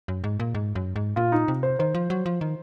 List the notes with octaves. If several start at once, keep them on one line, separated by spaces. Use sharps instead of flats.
F#2
G#2
A#2
G#2
F#2
G#2
A#2 F4
D#4
C3
C5
D#3 C5
F3
F#3
F3
D#3